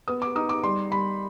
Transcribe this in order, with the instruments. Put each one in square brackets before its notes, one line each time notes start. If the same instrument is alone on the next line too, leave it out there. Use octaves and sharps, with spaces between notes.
[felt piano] B3 D#6
D6
D#4 D#6
D6
G3 C6
G3 B5